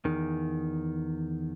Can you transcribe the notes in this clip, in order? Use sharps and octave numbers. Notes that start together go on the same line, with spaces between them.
E2 D#3